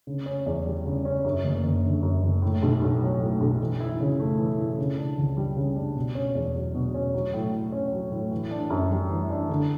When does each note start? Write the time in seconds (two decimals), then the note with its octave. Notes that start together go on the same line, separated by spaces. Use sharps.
0.07 C#3
0.26 C#4
0.46 E2
0.66 G3
0.85 C#3
1.05 C#4
1.24 F#2
1.44 F#1
1.64 F#1
1.84 D3
2.03 F#2
2.23 F#1
2.42 A2
2.63 B1
2.82 B1
3.02 F#3
3.20 A2
3.41 B1
3.60 E3
3.80 E4
4.00 C#3
4.19 A3
4.39 E3
4.58 E4
4.78 C#3
4.98 D4
5.17 C#2
5.37 G3
5.57 C#3
5.76 D4
5.95 B2
6.15 C#4
6.35 E2
6.55 F#3
6.75 B2
6.94 C#4
7.14 F#3
7.33 A2
7.53 A2
7.72 C#4
7.92 F#3
8.12 A2
8.31 E3
8.51 D4
8.70 F#2
8.90 G3
9.09 E3
9.30 D4
9.49 D3